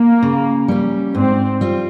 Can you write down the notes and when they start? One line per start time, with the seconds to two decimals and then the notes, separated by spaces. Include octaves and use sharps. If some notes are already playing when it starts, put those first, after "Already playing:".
Already playing: A#3
0.23 C#3
0.68 G3 C#4
1.15 G#2 C4
1.61 G3 C4 F4